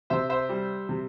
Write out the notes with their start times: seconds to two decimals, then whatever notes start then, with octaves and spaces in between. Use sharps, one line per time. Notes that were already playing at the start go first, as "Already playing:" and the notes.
0.10 C3 C5 E5
0.30 C5 E5
0.49 G3
0.89 C3